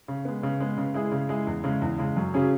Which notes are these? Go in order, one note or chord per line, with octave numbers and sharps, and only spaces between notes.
C#3
G#3 B3
C#3
G#3 B3
C#3
G#3 E4 G#4
C#3
G#3 E4 G#4
E2
C#3 G#3
E2
C#3 G#3
F#2
C#3 F#3 C#4 G#4